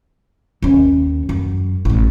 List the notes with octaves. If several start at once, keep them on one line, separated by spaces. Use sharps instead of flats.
D#2 C#4
F#2
A1 A2